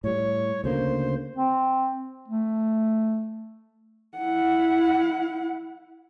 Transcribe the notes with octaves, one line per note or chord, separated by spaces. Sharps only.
A2 G3 C#5
D2 C#3 A#3 C5
C4
A3
E4 F#5